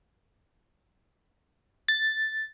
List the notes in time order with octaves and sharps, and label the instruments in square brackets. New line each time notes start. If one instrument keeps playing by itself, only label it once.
[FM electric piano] A6